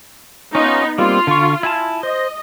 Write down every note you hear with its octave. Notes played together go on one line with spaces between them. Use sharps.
B3 C#4 D#4 F4
G3 A#3 C4 F4
D3 C#6
E4 G#5 A5
C5 D#5